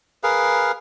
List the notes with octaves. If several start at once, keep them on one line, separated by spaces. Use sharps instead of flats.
G#4 A#4 B4 F5